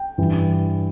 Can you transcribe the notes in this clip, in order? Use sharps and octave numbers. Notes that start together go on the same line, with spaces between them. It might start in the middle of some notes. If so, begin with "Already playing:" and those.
Already playing: G5
G2 E3